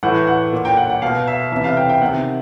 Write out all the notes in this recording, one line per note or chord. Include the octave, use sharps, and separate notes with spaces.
A2 E3 F#5
F#5
A#2
G5
F#5
F#5
B2 F5
E5
C3 E3 E5
F5
G5
G5
C3 D#3 F#5